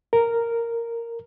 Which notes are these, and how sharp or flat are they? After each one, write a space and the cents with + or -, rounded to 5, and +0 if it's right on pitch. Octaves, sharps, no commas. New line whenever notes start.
A#4 -5